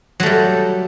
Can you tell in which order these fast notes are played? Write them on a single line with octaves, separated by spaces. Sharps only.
F#3 A3 G3